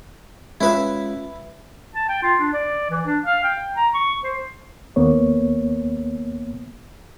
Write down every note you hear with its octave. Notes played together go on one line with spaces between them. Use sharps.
G#3 C#4 E4 F4 B4 E5
A5
G5
F4
D4
D5
E3
D4
F5
G5
A#5
C#6
C5
D#2 A#3 B3 C#5